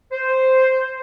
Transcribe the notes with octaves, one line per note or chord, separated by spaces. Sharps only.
C5